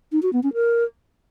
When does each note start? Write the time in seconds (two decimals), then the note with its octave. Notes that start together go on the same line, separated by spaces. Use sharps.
0.12 D#4
0.22 F#4
0.33 B3
0.43 C#4
0.54 A#4